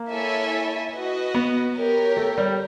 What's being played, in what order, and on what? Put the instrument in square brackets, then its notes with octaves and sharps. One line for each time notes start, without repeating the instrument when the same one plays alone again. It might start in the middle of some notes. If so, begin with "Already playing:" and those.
Already playing: [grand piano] A#3
[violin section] E4 A4 C#5 E5 G#5
F#4 B4 D#5
[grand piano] B3
[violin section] G4 A#4 C#5
[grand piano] A3
G3